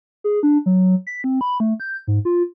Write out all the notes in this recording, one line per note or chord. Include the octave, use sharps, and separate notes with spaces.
G#4
D4
F#3
B6
C4
B5
A3
G6
G#2
F4